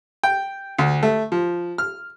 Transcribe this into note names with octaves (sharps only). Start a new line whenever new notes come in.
G5
D2
A3
F3
F6